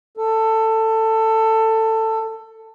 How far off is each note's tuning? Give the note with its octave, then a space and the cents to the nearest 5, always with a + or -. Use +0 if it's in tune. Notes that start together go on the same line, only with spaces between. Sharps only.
A4 +15